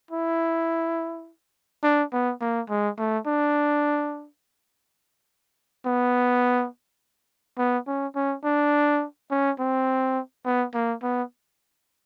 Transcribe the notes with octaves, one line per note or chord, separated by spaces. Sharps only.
E4
D4
B3
A#3
G#3
A3
D4
B3
B3
C#4
C#4
D4
C#4
C4
B3
A#3
B3